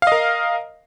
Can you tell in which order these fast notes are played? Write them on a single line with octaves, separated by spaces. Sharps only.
F5 D#5 A#4